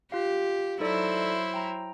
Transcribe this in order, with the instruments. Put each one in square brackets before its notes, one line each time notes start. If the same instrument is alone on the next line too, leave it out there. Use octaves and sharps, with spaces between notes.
[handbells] F4 F5 [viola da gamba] G4
[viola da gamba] F#3 E4 C5 [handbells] D#4 A4 D5
[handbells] G5 A#5